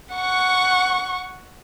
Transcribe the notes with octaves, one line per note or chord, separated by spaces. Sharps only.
F#5 C#6